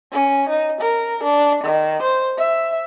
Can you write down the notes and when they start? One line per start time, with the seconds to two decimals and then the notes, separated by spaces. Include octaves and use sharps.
0.12 C#4
0.49 D#4
0.81 A#4
1.23 D4
1.64 D#3
2.03 C5
2.38 E5